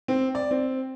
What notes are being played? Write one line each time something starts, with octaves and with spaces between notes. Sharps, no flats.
C4
D5
C4